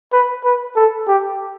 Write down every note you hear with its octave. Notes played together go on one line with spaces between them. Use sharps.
B4
B4
A4
G4